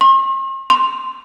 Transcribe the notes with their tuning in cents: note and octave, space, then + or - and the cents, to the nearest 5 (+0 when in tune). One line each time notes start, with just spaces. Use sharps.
C6 +45
C6 +5